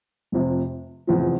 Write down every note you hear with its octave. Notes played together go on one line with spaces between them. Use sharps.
F1 F2 C3
F1 E2 C3 F3